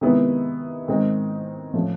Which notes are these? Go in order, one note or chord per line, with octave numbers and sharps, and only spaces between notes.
C3 D#3 G#3 B3 E4
G#2 D#3 G#3 C4 D#4
A2 F3 A3 C#4 F4